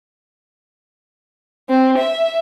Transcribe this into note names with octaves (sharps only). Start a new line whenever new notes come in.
C4
E5